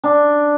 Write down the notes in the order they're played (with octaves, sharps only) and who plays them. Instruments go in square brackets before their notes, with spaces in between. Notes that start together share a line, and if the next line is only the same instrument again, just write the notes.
[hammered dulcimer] D4